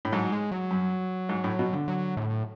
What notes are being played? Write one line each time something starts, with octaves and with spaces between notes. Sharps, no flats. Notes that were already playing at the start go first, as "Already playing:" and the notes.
A2
G#2 F#3
G#3
F#3
F#2
G#2
A2
B2
D3
F#3
A2